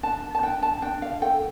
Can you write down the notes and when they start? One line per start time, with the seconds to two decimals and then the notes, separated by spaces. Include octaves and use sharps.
0.03 D4 A5
0.35 A5
0.43 D4 G5
0.62 A5
0.82 D4 G5
1.02 F5
1.22 A4 G5